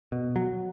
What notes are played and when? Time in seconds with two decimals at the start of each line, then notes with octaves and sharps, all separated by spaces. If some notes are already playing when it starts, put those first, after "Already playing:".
0.12 B2
0.36 F#3